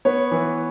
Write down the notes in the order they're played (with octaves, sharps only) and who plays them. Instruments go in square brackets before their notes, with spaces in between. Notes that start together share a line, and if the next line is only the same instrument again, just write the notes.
[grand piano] B3 C#5
E3